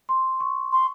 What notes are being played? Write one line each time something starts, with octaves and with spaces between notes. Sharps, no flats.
C6
C#6
C6